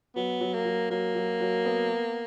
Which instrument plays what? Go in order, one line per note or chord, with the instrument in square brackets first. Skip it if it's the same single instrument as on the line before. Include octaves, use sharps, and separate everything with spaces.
[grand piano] F#3 [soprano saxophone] B3
[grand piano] F#3
[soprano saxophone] A#3
[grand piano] F#3
[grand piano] F#3 [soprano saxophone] A#3
[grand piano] F#3
F#3
B3